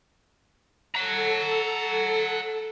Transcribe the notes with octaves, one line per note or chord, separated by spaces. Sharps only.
A4 F#5 A#5